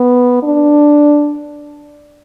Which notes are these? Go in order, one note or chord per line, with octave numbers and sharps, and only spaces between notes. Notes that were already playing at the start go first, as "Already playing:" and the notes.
Already playing: B3
D4